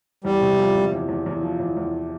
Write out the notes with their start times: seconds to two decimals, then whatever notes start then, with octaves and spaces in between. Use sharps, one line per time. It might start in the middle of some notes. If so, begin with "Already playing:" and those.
0.24 E2 G3
0.41 C3
0.58 F3
0.75 C3
0.92 E2
1.09 E2
1.26 E2
1.43 F3
1.60 E2
1.77 E2